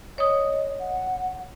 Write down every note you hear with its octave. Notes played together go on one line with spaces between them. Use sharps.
C#5 D#5 D#6
F#5